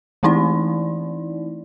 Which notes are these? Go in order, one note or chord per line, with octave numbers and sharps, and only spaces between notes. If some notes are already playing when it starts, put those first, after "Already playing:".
E3 A3 C4 D#4 E4 D5